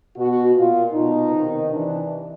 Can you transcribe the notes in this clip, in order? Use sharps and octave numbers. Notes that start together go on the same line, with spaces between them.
B2 F#4
A#2 F4
B2 D#4
C3 D#3
C3 E3 D4